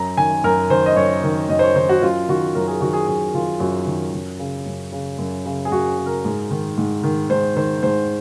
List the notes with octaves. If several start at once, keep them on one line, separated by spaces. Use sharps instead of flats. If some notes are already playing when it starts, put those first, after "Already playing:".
Already playing: F#2 A#5
D#3 G#5
F#2 A#4
D#3 C5
D#5
F#2 C#5
D#3
F#2 D#5
C5
C#5
D#3 C5
F#4
F#2 F4
D#3 F#4
F#2 A#4
G#4
D#3 F#4
G#4
F#2 G#4
D#3 F4
F#2 F#4
D#3
F#2
C#3
F#2
C#3
F#2
C#3
G#4
F#2 F#4
C#3
A#4
G#2
D#3
G#2
D#3
G#2 C5
D#3 C5
G#2 C5